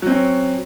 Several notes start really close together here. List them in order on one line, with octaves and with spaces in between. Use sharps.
F#3 C4 C#4